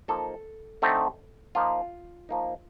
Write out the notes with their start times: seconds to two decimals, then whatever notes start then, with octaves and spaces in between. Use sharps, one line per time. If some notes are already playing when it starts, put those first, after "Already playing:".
0.08 F3 A#3 D#4 A4
0.82 D3 A3 C4 D#4
1.55 F3 A#3 D#4 F4
2.29 F3 A#3 D#4